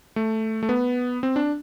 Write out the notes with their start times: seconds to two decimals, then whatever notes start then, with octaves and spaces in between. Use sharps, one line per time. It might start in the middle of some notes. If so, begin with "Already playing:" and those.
0.16 A3
0.63 A3
0.69 B3
1.23 C4
1.36 D4